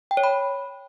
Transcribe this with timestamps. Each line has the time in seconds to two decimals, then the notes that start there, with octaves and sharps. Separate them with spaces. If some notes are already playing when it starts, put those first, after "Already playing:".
0.11 G5
0.17 C#5
0.24 B5